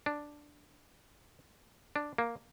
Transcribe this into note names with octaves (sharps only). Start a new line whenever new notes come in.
D4
D4
A#3